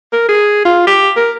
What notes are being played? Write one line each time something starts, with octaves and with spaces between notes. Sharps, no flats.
A#4
G#4
F4
G4
A#4